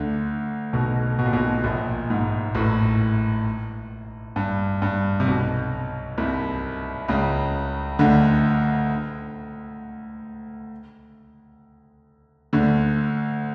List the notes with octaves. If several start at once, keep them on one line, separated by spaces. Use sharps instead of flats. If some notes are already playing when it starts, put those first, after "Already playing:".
Already playing: D2 D3
B1 B2
B2
A#2
B1 B2
A#1 A#2
G#2
A1 A2
G2
G2
C3
B1 B2
C2 C3
C#2 C#3
D2 D3
D2 D3